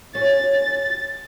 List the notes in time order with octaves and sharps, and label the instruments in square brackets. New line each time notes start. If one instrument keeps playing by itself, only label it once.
[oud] C#4 [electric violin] A6